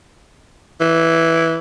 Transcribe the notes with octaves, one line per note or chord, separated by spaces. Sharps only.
E3